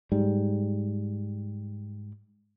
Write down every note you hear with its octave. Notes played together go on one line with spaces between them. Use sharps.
G#2 G3